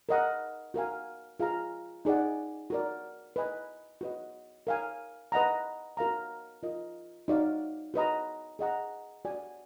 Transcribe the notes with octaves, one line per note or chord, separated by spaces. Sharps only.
A#4 D#5 F#5
F#4 A#4 F5 G#5
F4 G#4 B4 F5 A#5
D#4 G#4 D5 F#5
F#4 A#4 D5
B4 D#5 G#5
F#4 B4 D#5
A#4 F5 G#5
B4 D#5 F#5 A#5
F#4 A#4 F5 A#5
F4 A#4 D#5
D#4 F#4 D5 F5
F#4 B4 D#5 A#5
G#4 D#5 F#5 A#5
F#4 D5 G#5